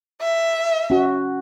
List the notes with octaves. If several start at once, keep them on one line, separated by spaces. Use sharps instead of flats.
E5
C#4 F#4